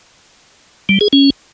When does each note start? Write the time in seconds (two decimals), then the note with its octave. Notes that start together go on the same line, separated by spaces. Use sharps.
0.89 G3
1.01 G#4
1.13 C#4